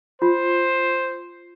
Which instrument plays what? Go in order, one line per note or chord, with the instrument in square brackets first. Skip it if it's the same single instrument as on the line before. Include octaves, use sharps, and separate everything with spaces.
[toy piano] F4 [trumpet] C5